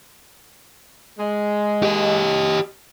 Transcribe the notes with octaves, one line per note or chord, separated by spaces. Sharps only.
G#3
G4 D#5